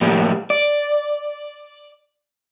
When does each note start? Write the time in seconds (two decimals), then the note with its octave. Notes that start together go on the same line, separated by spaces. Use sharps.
0.01 A2 F3 G3 A#3
0.50 D5